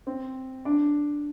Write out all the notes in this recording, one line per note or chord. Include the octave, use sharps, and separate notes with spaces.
C4
D4